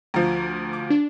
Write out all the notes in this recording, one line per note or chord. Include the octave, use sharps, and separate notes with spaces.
D2 F3 A#5 D6
D6
D4